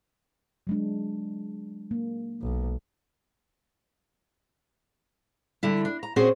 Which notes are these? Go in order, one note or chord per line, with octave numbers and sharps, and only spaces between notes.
F#3 G#3 D4
A#3
B1
D3 G3 E4
D4
A#5
A#2 C4 C#4 F#4 G#4 C5